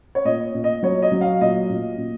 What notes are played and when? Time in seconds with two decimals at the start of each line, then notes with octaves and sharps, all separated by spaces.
0.15 C#5
0.25 A#2 D#5
0.55 A#2
0.64 D#5
0.83 F#3 C#5
1.02 D#5
1.12 F#3
1.21 F5
1.41 A#2 D#5
1.69 A#2
1.98 A#2